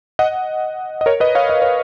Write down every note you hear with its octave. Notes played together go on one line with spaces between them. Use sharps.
D#5 F#5
D#5
A#4 C#5
B4 D#5
C#5 F5
D#5
C#5